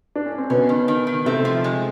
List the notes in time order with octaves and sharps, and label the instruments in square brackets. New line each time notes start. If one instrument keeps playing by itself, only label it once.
[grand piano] D4
C#4
C4
[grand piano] B2 B3 [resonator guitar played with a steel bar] C#4
[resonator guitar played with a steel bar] D#3
D#3
D#3
[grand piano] C3 C4 [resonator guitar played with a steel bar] A3
[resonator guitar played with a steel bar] F3
G#3